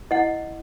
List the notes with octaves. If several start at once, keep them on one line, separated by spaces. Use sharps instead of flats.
E4 D#5 F#5